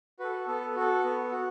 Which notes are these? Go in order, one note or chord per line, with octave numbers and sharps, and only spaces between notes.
F#4 A4 B4
B3 A4
F#4 A4
B3
F#4